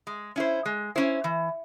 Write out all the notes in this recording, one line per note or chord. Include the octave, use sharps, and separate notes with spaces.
G#3
C#4 E4 C5
G#3
C#4 E4 C5
E3